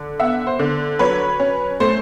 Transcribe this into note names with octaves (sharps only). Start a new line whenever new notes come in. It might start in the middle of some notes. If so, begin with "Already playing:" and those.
Already playing: D3
B3 E5 F#5
C5
D3
F#3 B4 C#5
C#4
A3 C5